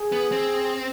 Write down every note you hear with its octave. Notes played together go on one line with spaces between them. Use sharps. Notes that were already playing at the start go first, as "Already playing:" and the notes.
Already playing: G#4
B3
C4